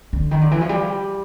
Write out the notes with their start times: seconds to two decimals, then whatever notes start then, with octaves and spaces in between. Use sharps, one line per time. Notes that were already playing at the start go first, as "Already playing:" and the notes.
0.13 D3
0.31 D#3
0.41 D3
0.51 E3
0.61 F3
0.69 G3